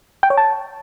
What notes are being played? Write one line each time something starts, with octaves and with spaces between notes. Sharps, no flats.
G5
C#5
A5